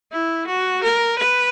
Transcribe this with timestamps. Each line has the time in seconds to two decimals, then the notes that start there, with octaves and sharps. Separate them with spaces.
0.12 E4
0.47 F#4
0.83 A#4
1.18 B4